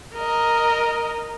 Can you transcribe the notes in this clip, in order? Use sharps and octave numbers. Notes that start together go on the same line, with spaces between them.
A#4 D#5